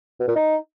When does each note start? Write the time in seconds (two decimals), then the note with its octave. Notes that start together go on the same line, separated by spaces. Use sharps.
0.20 B2
0.28 A#2
0.36 D#4